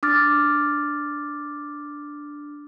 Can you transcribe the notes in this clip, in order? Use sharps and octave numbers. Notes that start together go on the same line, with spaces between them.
D4 D6 F6 A6